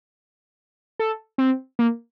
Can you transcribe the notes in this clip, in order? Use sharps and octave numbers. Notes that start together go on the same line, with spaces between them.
A4
C4
A#3